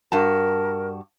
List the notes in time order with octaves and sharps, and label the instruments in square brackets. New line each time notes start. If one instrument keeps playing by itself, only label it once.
[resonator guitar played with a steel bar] G2 F#4 A5 [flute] A#4